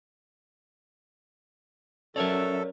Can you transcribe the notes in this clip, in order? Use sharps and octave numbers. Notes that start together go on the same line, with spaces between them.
F#3 C#4 A4 A#4 C#5 D5 E5 A5